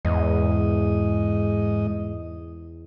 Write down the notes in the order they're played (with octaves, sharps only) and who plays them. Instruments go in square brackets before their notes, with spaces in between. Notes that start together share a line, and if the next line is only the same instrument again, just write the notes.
[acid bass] E2 [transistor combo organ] G#2 D#5